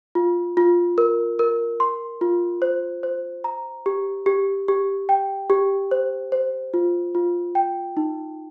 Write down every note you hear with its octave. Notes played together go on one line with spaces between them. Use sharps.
F4
F4
A#4
A#4
C6
F4
C5
C5
A#5
G4
G4
G4
G5
G4
C5
C5
F4
F4
G5
D#4